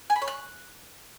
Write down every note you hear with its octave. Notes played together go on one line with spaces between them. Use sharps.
G#5
B5
C#5
F#6